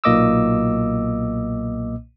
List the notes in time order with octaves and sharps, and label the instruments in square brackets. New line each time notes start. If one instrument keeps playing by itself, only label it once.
[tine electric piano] B1 A#2 A#3 D#5 D6 E6